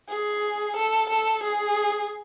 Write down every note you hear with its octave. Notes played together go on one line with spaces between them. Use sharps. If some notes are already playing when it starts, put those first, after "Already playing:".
G#4
A4
A4
G#4